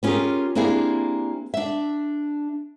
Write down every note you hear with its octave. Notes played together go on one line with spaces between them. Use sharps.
B3 C#4 F4 G4 G#4 A#4
A#3 C4 D4 E4 G4 G#4
D4 E5